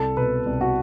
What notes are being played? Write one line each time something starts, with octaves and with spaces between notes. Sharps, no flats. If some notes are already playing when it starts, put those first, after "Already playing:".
Already playing: C2 A4
B2 B4
C2
F#4